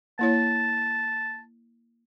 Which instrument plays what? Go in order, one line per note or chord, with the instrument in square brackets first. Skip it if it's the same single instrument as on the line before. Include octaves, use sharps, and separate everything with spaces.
[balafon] A#3 E4 C#5 [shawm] A5